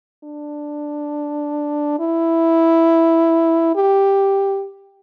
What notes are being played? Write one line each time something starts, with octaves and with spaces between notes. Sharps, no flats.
D4
E4
G4